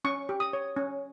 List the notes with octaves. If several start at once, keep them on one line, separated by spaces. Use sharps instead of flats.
C#4 C#6
G4
D#6
C#5
C#4